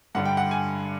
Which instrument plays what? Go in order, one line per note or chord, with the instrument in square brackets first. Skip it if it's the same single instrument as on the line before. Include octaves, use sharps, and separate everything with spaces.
[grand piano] G2 D3 G3 F#5
G5
F#5
G#5